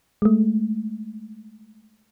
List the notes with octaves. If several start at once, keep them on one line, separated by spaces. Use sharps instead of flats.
G#3 A3